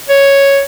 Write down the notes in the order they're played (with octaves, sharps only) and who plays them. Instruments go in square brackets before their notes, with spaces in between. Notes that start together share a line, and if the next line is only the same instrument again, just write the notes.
[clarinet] C#5